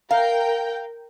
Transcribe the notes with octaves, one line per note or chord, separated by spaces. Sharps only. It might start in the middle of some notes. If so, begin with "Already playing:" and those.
A#4 F5 G5